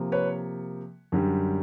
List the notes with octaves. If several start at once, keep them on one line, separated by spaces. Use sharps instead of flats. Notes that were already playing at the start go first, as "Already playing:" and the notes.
Already playing: C3 F3 A#3
B4 C#5
F#2 D3 G3